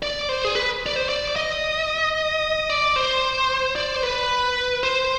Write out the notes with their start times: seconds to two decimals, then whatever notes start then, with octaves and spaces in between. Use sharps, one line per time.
0.02 D5
0.29 C5
0.44 G#4
0.55 B4
0.86 D5
0.96 C5
1.09 D5
1.36 D#5
2.70 D5
2.96 C5
3.76 D5
3.96 C5
4.03 B4
4.83 C5